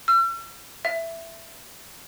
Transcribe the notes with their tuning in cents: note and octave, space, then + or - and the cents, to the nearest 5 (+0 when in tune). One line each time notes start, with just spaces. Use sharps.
E6 +45
E5 +10